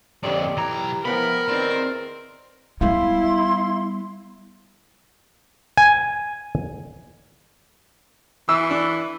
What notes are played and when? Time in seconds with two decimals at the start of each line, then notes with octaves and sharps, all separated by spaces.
0.23 F2 A#2 D3 G4 C#5 D5
0.57 B1 E3 A#5
1.05 E3 F3 B3 A#4 F#5 G5 B5
1.48 E2 D#3 C4 D5
2.81 G3 B3 E4 F5 C6
5.77 G#5
8.49 E3 E6
8.70 D4